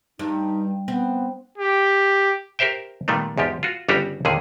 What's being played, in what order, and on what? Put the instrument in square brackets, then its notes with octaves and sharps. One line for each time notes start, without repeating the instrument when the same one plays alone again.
[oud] G2 [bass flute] D#4
[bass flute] B3 [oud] C4
[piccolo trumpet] G4
[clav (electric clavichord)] G4 A#4 C5 E5 G5
A#2 D#3 G3 A3 B3
E2 G#2 F3 G4
F4 F#4
G1 C#3 G3 D4 F#4 G4
D#2 A#2 D3 D#3 G#4